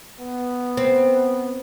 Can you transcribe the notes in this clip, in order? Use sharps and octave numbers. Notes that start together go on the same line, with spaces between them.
B3
C4